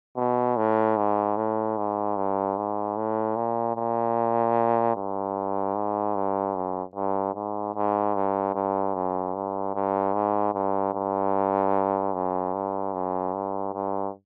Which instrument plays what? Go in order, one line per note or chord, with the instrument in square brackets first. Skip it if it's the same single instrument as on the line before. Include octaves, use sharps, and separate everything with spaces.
[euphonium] B2
A2
G#2
A2
G#2
G2
G#2
A2
A#2
A#2
G2
G#2
G2
F#2
G2
G#2
G#2
G2
G2
F#2
G2
G2
G#2
G2
G2
F#2
G2
F#2
G2
G2